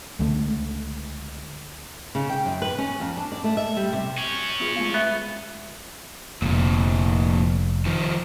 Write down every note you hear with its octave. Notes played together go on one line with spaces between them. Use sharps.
C#2 D3 A3
C#3
G5
F#2
B4
C#4
F2
D4
D5
A3
E5
G3
C3
C#4 F#4
B3 F4 G#4
G#3 A3 F4 F5
B3 E5
F1 F2 A#2
D#3 F3